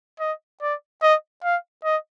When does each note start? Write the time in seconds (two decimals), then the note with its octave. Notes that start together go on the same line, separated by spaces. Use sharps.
0.20 D#5
0.62 D5
1.02 D#5
1.44 F5
1.84 D#5